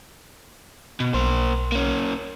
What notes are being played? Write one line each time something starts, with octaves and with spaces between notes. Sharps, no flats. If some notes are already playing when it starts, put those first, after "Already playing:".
B2
B1 A#3 C5
A#3 C#4